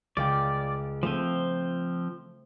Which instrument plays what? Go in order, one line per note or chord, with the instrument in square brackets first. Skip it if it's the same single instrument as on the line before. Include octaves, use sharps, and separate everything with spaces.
[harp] C#2 F5 G5 [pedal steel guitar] D5
[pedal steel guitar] F3 C4 [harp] A3 C5 D#7